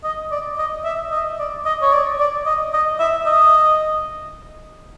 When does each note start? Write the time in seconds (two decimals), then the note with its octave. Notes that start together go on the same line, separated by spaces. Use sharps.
0.04 D#5
0.31 D5
0.58 D#5
0.84 E5
1.11 D#5
1.39 D5
1.65 D#5
1.82 C#5
1.93 D5
2.19 D5
2.46 D#5
2.73 D#5
2.99 E5
3.26 D#5